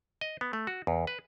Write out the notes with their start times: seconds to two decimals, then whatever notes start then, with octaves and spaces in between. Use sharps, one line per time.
0.21 D#5
0.41 B3
0.53 A3
0.67 F#4
0.87 E2
1.07 B4